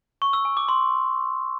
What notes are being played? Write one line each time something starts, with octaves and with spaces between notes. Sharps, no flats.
C#6
E6
G#5
D6
C6